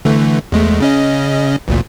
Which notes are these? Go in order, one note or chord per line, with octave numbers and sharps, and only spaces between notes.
D3 E3 A3
E2 G#3 A3
C#3 C#4 D#5
A1 D2 A#2